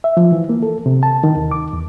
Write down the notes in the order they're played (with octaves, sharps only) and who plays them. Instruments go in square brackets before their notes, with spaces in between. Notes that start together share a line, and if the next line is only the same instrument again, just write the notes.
[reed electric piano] E5
F3
E3
A#3
A4
C3
A5
D#3
D#2
D6
E2